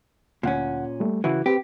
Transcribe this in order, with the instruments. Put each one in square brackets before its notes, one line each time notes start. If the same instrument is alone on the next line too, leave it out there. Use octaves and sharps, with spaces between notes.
[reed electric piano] D2 F#5 [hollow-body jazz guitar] A#2 C#4
[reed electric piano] G3 A3
[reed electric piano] C#3 E4 F#4 [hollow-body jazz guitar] E3
[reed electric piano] C4 B4 [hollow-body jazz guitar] G4